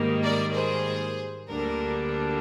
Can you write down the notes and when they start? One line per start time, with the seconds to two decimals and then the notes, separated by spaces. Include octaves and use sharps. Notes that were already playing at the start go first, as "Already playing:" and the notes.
Already playing: G#2 D#3 G3 A#3
0.23 A#4 D5
0.54 G#4 C5
1.48 D2 D3 G3 A#3 D4 A#4